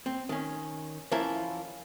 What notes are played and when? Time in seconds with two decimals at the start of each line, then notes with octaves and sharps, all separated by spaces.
0.06 C4
0.29 D#3 C#4
1.12 E3 F3 C#4 E4 A#4